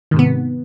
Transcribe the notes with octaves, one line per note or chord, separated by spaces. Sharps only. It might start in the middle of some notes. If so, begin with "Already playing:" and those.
G#2 C3 D#3 B3